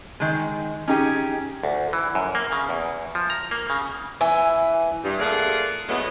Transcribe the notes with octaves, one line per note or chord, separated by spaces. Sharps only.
D#3 G#3
C#4 D#4 G4 G#4
D2
E3
F#2
A#3
C#3
E2
F3
A#5
A#3
C#3
E3 G#5
G2
A#2 A3 G#4 D5 F5 F#5
E2 D3 F#3 G#3 A3 B3